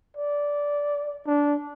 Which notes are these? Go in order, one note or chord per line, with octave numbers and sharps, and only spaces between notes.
D5
D4